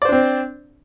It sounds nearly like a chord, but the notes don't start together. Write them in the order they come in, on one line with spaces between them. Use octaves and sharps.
D5 C5 D4 C4